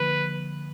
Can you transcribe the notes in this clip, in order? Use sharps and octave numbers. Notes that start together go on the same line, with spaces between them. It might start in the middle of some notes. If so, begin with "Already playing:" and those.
Already playing: D3 F3 A#3 B4